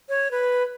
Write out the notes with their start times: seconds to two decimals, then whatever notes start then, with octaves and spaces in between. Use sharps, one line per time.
0.09 C#5
0.31 B4